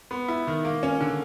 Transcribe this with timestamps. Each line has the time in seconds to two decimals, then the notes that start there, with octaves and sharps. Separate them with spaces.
0.11 B3
0.28 E4
0.47 D#3
0.65 A#3
0.83 C#4
1.00 D3